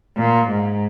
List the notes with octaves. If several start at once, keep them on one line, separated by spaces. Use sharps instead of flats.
A#2
G#2